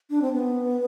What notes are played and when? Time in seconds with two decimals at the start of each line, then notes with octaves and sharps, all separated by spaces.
0.10 D4
0.22 C4
0.32 B3